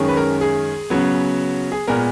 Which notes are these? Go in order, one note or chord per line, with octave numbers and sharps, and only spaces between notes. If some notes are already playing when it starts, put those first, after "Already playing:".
Already playing: F#2 D#3 G#3 C#4
B4
A#4
G#4
C#3 F#3 B3
G#4
A#2 G#3 B3 A#4